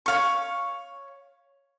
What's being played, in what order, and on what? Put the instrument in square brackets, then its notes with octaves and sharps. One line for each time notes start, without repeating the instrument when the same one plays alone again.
[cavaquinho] C#5 F5 C#6